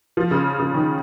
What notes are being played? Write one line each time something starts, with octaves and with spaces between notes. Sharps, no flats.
F3
C#3
C#3
D#3